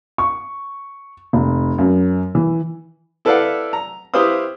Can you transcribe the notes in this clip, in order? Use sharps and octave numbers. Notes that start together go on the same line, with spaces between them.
C#6
F1
F#2
E3
E4 A4 B4 D5 F5 F#5
A#5
E4 G4 B4 C5 F5 D#6